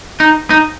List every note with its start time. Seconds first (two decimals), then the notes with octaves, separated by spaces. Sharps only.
0.20 D#4
0.50 D#4